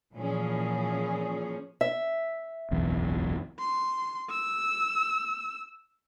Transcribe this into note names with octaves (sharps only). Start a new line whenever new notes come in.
A#2 E3 F3 C#4 G#4
E5
F#1 B1 E2
C6
E6